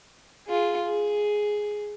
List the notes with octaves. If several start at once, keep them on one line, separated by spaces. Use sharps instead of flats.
F4 G#4
G#4